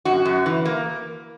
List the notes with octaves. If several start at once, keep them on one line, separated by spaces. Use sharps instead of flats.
F#2 F#4
F#2
E3
A#3